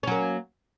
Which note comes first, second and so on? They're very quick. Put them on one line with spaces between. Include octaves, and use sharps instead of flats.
C#4 F#3 A#3